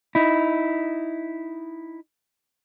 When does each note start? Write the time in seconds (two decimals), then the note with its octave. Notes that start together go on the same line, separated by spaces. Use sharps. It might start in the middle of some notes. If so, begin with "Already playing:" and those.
0.15 D#4 E4